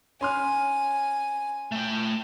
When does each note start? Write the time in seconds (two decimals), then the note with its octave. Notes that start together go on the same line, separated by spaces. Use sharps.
0.21 C#4 G#5 C6 F6
1.72 A3 G5